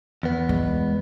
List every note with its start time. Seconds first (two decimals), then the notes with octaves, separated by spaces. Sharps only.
0.23 E2 B3
0.49 G#3